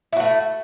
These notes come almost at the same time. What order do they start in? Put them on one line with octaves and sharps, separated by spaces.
E4 F#4 A3